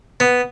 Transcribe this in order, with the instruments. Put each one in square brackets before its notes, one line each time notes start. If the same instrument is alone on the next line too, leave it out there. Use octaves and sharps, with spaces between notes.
[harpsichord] B3